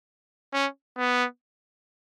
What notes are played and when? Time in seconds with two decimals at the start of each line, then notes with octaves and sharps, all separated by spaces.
0.53 C#4
0.98 B3